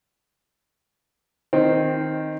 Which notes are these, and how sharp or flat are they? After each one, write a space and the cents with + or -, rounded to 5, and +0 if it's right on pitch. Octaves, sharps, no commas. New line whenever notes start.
D#3 +0 C4 +0